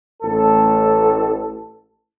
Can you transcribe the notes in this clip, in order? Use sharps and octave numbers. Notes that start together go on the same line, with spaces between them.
A1 A4